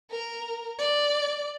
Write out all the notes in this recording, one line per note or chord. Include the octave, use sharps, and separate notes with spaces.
A#4
D5